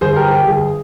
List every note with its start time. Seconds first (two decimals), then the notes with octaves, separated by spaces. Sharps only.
0.01 G1 G#4 C5
0.16 G4 A#4
0.24 F3
0.31 G4
0.47 G1 G#4